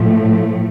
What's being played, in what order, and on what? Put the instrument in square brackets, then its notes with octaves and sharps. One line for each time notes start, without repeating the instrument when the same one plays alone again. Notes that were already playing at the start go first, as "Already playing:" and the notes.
Already playing: [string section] A2 F3 A3